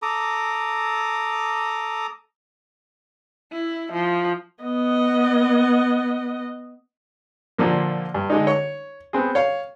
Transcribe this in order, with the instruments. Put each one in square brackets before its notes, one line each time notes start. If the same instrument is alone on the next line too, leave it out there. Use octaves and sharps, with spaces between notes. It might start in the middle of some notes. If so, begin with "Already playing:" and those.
[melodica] A4 A#5 D6 D#6
[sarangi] E4
F3
[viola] B3 D#5
[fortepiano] A#2 D3 F3 A#3
G2
D3 G#3 D#4
C#5 C#6
B3 C4 G#4
C#5 F5